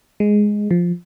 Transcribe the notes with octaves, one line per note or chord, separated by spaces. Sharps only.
G#3
F3